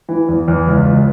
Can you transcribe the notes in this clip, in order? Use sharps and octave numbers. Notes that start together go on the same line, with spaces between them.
E3
E2
E2
C#2
C#2